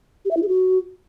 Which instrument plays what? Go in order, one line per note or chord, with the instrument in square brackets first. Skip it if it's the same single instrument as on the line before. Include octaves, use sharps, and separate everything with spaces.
[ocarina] G4
E5
E4
G#4
F#4